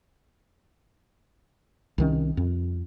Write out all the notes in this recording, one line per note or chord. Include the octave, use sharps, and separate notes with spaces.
C2 D#3 C#4
F2